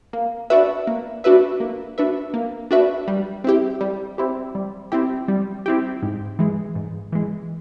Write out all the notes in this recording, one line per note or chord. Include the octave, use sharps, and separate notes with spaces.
A#3
D4 F#4 B4 E5
A#3
D4 F#4 B4 E5
A#3
D4 F#4 B4 E5
A#3
D4 F#4 B4 E5
G3
C4 E4 G4
G3
C4 E4 G4
G3
C4 E4 G4
G3
C4 E4 G4
G#2
E3 G#3
G#2
E3 G#3